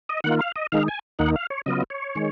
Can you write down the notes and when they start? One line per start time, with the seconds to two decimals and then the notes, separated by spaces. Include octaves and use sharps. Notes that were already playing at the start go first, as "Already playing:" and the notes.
0.09 D#5
0.24 D#3 A#3 F4 F#5
0.41 F5
0.56 D#5
0.72 D#3 G#3 D#4 F5
0.88 G#5
1.19 D#2 D#3 A#3 D#4 F#5
1.36 F5
1.50 C#5
1.66 C#3 F#3 B3 F4 D#5
1.90 C#5
2.15 D#3 G#3